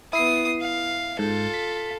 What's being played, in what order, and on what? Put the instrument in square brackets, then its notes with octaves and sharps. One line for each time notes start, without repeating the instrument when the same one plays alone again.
[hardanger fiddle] B3 D#6 [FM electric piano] E4 C7
[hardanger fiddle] F5
[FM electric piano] G#2 [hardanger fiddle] F4 A4
[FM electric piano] B6